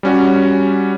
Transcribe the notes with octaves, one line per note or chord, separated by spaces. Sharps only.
G3 C#4 F#4